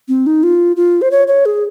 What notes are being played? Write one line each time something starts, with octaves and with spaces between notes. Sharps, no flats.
C4
D#4
F4
F4
C5
C#5
C#5
G#4